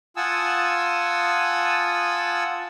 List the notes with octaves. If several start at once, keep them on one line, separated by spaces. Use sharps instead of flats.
F4 F#5 G#5 A5 D#6 E6